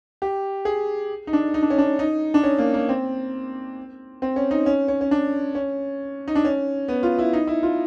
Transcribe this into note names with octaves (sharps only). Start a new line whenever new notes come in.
G4
G#4
D#4
D4
D#4
D4
C#4
D4
D#4
D4
C#4
A#3
A#3
C4
C4
C#4
D#4
C#4
C#4
C#4
D4
C#4
D#4
D4
C#4
B3
F4
E4
D#4
E4
F4